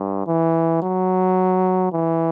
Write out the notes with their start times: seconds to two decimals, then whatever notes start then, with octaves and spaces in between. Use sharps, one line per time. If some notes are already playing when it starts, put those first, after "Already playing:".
Already playing: G2
0.27 E3
0.82 F#3
1.93 E3